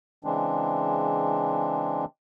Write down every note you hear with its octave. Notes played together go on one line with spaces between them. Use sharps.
C#3 E3 G#3 C4 D4